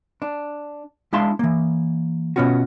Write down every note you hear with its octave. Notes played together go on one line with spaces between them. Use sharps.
D4
G#3 D4 E4 F5 A5 C6
E3 A#3
B2 B3 C#4 F4 F#4